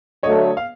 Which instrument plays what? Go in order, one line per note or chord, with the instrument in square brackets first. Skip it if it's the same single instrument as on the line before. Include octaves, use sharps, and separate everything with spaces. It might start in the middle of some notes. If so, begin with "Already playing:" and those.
[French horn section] D3 F#3 A3 [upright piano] C#5 D#5
[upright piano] F5